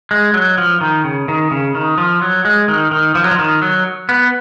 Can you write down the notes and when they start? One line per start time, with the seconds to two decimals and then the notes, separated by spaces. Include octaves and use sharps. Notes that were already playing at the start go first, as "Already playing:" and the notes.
0.11 G#3
0.34 F#3
0.58 F3
0.81 D#3
1.04 C#3
1.28 D#3
1.51 C#3
1.75 D#3
1.98 F3
2.22 F#3
2.45 G#3
2.68 D#3
2.91 D#3
3.15 F3
3.24 F#3
3.31 F3
3.38 D#3
3.62 F#3
4.09 B3